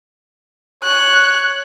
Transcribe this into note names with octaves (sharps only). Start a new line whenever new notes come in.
C#5 F#6